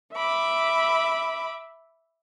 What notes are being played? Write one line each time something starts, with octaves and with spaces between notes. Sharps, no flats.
E5 B5 D6